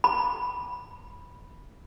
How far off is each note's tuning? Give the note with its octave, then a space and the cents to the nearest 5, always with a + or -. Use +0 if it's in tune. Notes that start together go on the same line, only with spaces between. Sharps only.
B5 -10